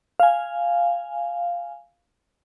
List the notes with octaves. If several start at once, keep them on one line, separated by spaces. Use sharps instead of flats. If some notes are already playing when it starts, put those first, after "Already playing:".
F5 G#5